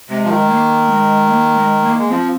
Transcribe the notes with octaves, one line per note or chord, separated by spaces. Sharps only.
C3 G#3
F3
D#3
A#3
G#3
A#3
G#3
A#3
G#3
F3 C4